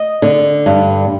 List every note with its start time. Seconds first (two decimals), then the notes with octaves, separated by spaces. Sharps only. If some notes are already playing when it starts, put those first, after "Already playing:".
Already playing: D#5
0.22 D3
0.66 G2